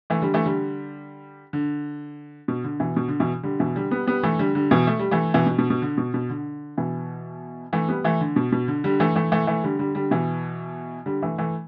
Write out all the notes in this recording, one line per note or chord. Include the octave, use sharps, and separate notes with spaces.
E3 A3
D3 G3
E3 A3
D3 G3
D3
B2
D3
B2 E3
B2
D3
B2 E3
D3 G3
B2 E3
D3 G3
G3 B3
G3 B3
E3 A3
D3 G3
D3 G3
B2 E3
A3
G3
E3 A3
B2 E3
B2
B2
B2
D3
B2
B2
D3
B2 E3
E3 A3
G3 B3
E3 A3
D3
B2
B2
D3
D3 G3
E3 A3
E3 A3
E3 A3
E3 A3
D3 G3
D3 G3
D3 G3
B2 E3
D3 G3
E3 A3
E3 A3